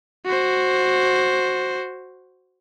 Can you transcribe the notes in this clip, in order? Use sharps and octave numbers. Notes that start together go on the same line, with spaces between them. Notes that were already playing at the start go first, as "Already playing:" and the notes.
F#4 C5